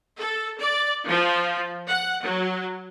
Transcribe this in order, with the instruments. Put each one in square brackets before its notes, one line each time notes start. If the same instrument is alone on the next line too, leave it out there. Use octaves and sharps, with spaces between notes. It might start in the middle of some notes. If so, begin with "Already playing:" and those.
[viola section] A4
D5
F3
F#5
F#3